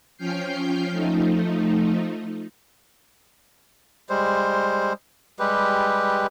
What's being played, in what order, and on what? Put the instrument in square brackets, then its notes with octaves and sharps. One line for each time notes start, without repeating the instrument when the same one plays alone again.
[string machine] F3 C#4 G5 F6 G6 C7
F3 A3 D#4
[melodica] G3 G#3 C5
G3 G#3 G4 B4